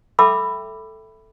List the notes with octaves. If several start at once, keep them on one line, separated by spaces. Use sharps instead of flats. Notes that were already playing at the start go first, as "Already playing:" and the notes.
A4 E5 G5 B5 D6 E6